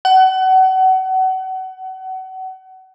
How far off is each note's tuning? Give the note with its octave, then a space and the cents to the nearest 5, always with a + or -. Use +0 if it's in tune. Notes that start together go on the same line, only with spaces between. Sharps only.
F#5 +30